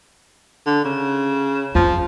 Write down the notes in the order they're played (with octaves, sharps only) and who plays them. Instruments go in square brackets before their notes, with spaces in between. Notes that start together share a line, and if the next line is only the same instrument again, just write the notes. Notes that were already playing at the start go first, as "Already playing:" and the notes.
[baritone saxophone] D3
C#3
[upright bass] F2 [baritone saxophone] F3